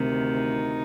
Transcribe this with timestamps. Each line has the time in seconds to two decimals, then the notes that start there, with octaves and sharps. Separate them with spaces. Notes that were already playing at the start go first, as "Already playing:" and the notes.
Already playing: D2 C3 D#3
0.38 D#4